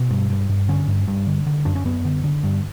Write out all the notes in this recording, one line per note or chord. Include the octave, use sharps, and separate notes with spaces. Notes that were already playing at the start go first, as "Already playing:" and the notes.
Already playing: B2
G2
G2
G2
D3 C#4
G2
G2
D3
D3
F#2 D4
C#4
F#2 B3
D3
D3
G2